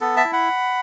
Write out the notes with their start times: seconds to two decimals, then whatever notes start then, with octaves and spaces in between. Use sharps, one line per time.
0.01 B3 A4
0.17 E5 A5
0.25 E4
0.33 F#5 B5